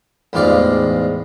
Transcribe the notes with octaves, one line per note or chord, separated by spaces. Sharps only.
A1 E2 G#2 F4 D5 F5